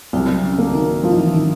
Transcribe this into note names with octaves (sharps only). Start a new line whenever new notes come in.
C2 F#3 F#4
C#3 C#4
A#3
D#3 D#4
F3 E4
D#4
E3 E4
D#3 D#4